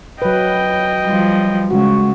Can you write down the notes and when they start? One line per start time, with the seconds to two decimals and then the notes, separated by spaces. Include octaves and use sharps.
0.22 F#3 B4 D#5 G5
1.05 F3 G3
1.70 C#3 G#3 F#4